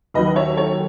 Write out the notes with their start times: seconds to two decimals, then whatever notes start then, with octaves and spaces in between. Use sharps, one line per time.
0.14 D#2 D#3 F#3 B4 D#5
0.36 C#5 E5
0.56 A4 C#5